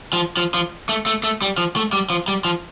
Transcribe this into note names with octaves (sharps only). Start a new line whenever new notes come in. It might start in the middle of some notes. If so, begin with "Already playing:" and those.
F3
F3
F3
A3
A3
A3
G3
F3
A3
G3
F3
G3
F3